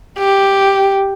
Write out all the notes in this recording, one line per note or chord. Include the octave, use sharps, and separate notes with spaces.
G4